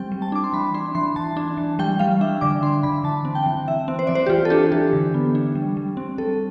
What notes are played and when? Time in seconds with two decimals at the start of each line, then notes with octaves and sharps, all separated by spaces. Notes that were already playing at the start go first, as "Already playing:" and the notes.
Already playing: G3 C4 G5
0.12 G3
0.22 A5
0.32 D4 D6
0.44 C6
0.53 E3 B5
0.74 D4 C6
0.95 E3 C6
1.16 E3 A5
1.37 D4
1.57 E3
1.79 G3 G5
1.99 G3 F5
2.21 D4 E5
2.41 D3 D6
2.63 D4 C6
2.83 D3 B5
3.04 E3 A5
3.25 C4
3.35 G5
3.46 E3
3.68 E3 E5
3.88 C4
3.99 C5
4.07 E3 D5
4.15 C5
4.26 G4
4.30 E3 F4
4.45 A4
4.50 D4 G4
4.72 E3 G4
4.93 D3
5.14 B3
5.35 D4
5.55 G3
5.77 G3
5.97 C4
6.18 G3 A4